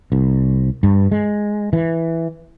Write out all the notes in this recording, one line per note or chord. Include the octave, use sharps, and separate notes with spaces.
C2
G2
G#3
E3